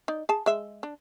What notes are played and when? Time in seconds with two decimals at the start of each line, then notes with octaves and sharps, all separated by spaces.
0.08 D#4 D5
0.29 G#4 A5
0.46 G#3 E5
0.83 D4